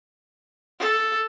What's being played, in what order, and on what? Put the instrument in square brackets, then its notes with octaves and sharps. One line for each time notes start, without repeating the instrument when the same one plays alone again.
[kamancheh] A4